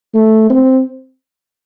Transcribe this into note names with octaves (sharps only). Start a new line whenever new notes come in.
A3
C4